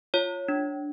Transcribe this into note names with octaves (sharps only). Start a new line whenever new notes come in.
F4 C#5
D4